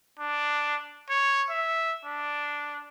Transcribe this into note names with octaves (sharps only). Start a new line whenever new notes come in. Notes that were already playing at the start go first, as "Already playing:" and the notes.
D4
C#5
E5
D4